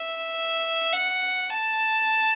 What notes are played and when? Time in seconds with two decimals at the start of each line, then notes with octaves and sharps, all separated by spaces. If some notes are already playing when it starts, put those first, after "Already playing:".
Already playing: E5
0.92 F#5
1.50 A5